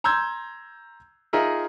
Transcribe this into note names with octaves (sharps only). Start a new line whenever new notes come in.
A#5 C6 E6 G6 G#6
D#4 F4 G#4 A#4 E5